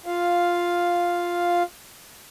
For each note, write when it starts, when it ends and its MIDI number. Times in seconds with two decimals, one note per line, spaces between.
0.06 1.63 65
0.06 1.63 77